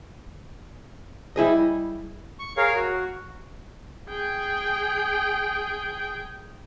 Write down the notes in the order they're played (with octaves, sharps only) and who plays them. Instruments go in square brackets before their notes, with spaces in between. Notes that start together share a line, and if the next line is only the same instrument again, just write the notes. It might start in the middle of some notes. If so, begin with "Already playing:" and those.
[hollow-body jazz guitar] G3 E4 G#4 D#5
[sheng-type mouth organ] C#6
G#4 A#4 C#5 F5
F#4
[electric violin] G#4 G5